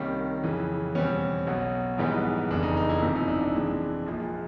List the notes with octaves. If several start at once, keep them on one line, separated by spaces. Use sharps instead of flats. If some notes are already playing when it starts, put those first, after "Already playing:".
Already playing: C2 C3 D#3 G3 A#3 C#4
F2 C#3 E3
E2 B2 G3 C4 C#4
B1 B2 F#3
A#1 G#2 E3 G3 B3
F1 E2 C#3 D4
D#4
D#4
E4
G1 F2 C3 F3 E4
D#4
D4
D4
F2 C3 E3 G#3
A#1 A#2 F3 G#3